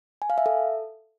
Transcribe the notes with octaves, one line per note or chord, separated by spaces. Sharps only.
G#5
F5
E5
A4